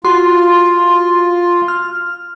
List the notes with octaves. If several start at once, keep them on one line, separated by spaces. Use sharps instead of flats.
F4 F#4 C6
F6